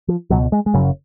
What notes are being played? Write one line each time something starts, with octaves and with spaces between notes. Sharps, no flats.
F3
C#2 B2 F#3
G#3
G#3
F#1 F#2 C#3 F#3